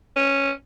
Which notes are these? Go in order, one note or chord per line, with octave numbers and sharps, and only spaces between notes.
C#4